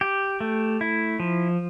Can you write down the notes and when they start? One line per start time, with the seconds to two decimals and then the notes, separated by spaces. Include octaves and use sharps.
0.01 G4
0.41 A3
0.81 E4
1.20 F3